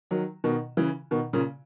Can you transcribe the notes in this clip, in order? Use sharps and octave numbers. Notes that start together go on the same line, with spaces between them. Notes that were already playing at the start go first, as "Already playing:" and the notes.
D#3 F#3
B2 D#3
C#3 E3
B2 D#3
A#2 C#3